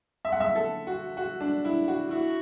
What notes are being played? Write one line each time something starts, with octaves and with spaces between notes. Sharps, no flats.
E5
F#5
E5
A4
F#4
F#4
D4
E4
F#4
E4 F#4